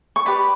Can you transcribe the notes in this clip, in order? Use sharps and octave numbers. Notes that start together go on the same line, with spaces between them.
C#6
G4 B4 D5 B5